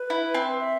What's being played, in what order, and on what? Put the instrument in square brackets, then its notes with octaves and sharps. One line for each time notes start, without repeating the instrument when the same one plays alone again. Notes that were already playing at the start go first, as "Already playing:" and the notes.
Already playing: [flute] B4
[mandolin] E4
C4
[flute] E5